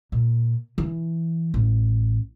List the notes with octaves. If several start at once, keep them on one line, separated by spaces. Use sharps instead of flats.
A#2
E3
A1